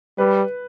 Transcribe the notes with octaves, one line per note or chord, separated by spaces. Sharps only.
G3 B4